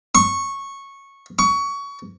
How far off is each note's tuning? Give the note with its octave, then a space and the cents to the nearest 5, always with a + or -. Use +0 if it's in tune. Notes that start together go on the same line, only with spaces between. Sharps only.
C#6 -10
C#6 +25